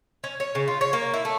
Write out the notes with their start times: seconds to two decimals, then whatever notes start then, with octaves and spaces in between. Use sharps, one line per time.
0.24 C#4
0.40 C#5
0.55 C#3
0.68 F4
0.81 C#5
0.93 A#3
1.14 E4
1.25 A3